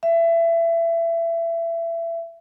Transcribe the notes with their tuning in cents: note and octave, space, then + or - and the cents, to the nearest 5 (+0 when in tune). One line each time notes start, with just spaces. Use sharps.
E5 +25